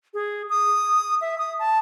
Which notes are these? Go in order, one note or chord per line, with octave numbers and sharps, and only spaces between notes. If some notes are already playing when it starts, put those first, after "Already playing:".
G#4
D#6
E5
D#6
A5